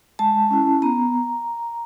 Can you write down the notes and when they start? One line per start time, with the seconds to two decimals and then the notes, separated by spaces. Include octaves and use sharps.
0.19 G#3 A5
0.51 C#4 E4
0.82 B3 A#5